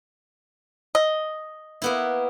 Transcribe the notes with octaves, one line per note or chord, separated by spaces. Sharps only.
D#5
A#3 B3 E4